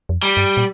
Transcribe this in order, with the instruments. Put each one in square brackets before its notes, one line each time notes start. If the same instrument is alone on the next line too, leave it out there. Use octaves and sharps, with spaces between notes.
[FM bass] F2
[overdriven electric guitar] G3
[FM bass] G2
A#2